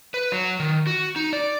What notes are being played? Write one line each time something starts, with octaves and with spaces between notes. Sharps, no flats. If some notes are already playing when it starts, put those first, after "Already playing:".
B4
F#3
D#3
F#4
D#4
D5